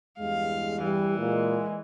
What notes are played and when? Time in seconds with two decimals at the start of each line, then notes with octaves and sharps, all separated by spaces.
0.20 E2 G2 G#3 F5
0.83 E3 G3
1.19 A#2 G#3